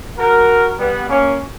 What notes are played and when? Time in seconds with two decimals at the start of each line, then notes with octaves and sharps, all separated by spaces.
0.18 F#4 A#4
0.77 G3 B3
1.08 A#3 C#4